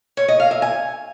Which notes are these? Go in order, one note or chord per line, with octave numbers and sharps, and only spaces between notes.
C#5
D#5
F5
E5
G#5